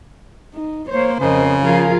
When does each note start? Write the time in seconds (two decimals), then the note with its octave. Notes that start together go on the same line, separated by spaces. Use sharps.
0.53 D#4
0.89 A#3 C5 C#5
1.19 F2 C#3 A#4 C5 D#5
1.63 F3 F4 G#4 A#4 F5